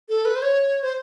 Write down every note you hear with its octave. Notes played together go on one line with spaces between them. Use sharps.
A4
B4
C5
C#5
C5